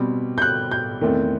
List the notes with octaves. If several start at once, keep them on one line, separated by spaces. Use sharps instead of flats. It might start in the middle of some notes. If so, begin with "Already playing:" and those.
Already playing: B2 G3 C4
G6
F#6
G6
E2 D#3 A3 C4